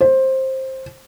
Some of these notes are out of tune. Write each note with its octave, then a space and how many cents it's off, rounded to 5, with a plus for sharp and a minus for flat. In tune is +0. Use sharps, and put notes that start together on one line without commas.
C5 +15